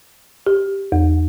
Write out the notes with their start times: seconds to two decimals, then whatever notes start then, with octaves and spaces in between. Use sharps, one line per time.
0.46 G4
0.92 E2